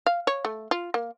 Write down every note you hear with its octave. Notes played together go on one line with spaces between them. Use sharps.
F5
C#5
A3
F4
A#3